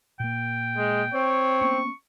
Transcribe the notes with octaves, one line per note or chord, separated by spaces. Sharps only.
A#2 A#3 G5
G#3
C4 C#5
A#3 B3 C#4 C#6